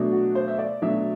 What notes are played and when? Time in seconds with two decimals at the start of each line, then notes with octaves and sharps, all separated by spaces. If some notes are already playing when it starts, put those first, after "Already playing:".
Already playing: B2 F#3 A3 D4
0.12 F#4
0.35 C5
0.48 E5
0.59 D5
0.82 B2 F#3 A3 D4 E5